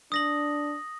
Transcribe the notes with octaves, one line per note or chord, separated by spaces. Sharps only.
D4 D#6 A#6 F#7